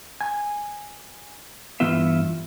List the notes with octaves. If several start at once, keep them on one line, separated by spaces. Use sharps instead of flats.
G#5
G2 E3 B3 F4 E5